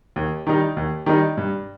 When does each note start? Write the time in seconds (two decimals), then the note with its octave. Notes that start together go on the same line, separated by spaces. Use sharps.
0.16 D#2
0.47 D#3 G3 D#4
0.77 D#2
1.06 D#3 G3 D#4
1.37 G2